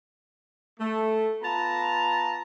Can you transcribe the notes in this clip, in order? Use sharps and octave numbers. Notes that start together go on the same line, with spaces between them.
A3
B3 F4 A5 A#5